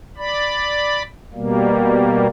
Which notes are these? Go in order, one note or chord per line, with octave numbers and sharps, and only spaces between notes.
D5 B5
B2 G3 A#3